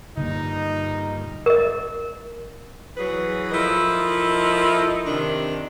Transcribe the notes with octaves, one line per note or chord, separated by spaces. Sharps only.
G2 A#2 D3 A#3 D#4
A#4 D#5
E3 F#3 G#4 B4
F3 E4 A4 A#4 D#5
C3 D#3 D4